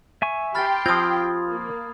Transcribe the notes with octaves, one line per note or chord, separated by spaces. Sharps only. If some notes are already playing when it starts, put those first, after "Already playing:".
E5 G#5 C#6
G4 G5 B5 C6 F6 A6
F3 C4 F4 D#6 G#6
A#3